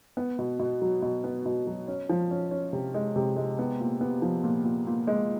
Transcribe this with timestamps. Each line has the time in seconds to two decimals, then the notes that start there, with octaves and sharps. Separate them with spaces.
0.17 B3
0.39 B2
0.59 B2
0.82 F#3
1.02 B2
1.24 B3
1.46 B2
1.67 F#3
1.88 C#4
2.09 F3
2.31 C#4
2.51 C#4
2.73 C3
2.94 G#3
3.16 C3
3.36 G#3
3.59 B3
3.80 A#2
4.01 B3
4.22 F3
4.44 A#2
4.64 A#2
4.87 A#2
5.07 G#3